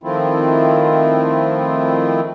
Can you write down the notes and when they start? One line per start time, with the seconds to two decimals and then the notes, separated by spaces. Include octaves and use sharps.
0.04 D#3 F3 A3 C4 E4 F4